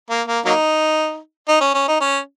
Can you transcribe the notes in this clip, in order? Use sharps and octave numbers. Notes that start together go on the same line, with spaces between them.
A#3
A#3
F#3 A#3 D#4
D#4
C#4
C#4
D#4
C#4